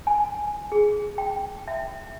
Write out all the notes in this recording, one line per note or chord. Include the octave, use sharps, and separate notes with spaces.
G#5
G#4
G5
E5